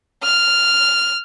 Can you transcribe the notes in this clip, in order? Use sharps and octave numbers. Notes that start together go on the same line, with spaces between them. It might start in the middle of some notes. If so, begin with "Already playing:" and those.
F6